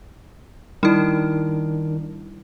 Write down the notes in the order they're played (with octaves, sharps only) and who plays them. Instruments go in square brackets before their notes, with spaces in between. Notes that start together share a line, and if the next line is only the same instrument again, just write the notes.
[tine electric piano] D#3 D4 [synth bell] G3 E4